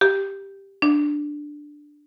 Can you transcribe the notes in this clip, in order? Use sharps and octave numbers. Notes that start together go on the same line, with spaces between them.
G4
D4